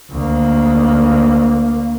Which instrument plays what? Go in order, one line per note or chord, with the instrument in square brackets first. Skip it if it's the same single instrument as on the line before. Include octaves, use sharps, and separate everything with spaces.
[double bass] D2 A#3